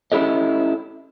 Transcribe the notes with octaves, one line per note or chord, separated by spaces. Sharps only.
C#4 E4 G4 A4 D#5